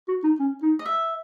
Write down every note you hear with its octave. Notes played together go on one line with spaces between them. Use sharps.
F#4
D#4
C#4
D#4
D#5
E5